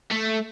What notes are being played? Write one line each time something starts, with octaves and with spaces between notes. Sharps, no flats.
A3